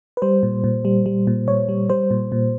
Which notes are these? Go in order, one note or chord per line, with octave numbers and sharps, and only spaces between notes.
B4
G3 C5
A#2
A#2
G3
G3
A#2
A#2 C#5
G3
G3 C5
A#2
A#2